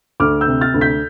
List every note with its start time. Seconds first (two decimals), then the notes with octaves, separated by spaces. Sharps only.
0.20 D2 D6 F6
0.41 E6 G6
0.48 C3
0.61 F6 A6
0.74 D2
0.81 G6 B6